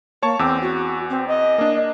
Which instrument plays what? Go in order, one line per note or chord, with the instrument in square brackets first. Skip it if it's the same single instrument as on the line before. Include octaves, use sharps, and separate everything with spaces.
[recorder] A#3 [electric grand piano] C#5 A5 C#6
[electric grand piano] E2 D6 E6 [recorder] C4
[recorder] F#4
C4
D#5
[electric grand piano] A#3 D4